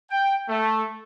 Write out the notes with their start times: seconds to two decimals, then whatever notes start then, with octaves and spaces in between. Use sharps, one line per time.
0.10 G5
0.49 A3